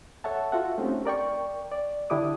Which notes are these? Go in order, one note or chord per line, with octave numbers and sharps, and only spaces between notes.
A4 C#5 E5 F#5 A5
F4 F#4 A4 E5 F#5
A3 C4 C#4 D#4 G4
A#4 D5 G5 C#6
D5
D3 D4 E4 G4 D6 D#6